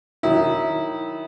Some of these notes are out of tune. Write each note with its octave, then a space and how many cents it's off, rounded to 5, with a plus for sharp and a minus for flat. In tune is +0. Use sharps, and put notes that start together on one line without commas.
D#3 +0 F#3 +0 E4 -20